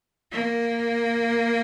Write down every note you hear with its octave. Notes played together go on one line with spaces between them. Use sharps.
A#3